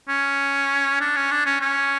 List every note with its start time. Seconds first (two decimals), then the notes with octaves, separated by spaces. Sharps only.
0.08 C#4
1.01 D4
1.16 C#4
1.31 D4
1.46 C#4
1.61 C#4